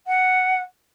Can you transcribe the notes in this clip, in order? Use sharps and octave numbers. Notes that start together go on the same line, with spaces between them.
F#5